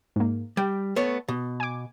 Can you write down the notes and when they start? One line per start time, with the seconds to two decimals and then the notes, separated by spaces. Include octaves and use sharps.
0.16 G#2 A#3
0.57 G3 G5
0.96 A3 B3 C#5
1.28 B2
1.60 G#5 D6